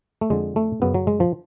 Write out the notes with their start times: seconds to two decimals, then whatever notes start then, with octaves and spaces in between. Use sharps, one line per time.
0.21 A3
0.30 F2 D3 G#3
0.56 A3
0.82 F#2 C#3 B3
0.94 F#3
1.07 G#3
1.20 F3